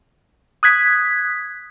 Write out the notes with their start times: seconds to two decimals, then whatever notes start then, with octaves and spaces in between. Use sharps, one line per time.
0.63 D#6 F#6 G#6 B6